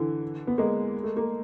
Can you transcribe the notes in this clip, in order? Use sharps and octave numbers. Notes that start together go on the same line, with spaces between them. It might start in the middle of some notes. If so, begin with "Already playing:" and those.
Already playing: D3 E3
B3
G#3 A#3
A3
A#3